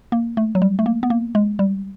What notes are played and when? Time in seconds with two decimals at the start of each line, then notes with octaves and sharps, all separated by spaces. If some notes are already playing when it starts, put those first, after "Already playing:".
0.12 A#3
0.37 A3
0.55 F#3
0.62 G3
0.79 A3
0.86 A#3
1.03 B3
1.10 A#3
1.35 G#3
1.59 G3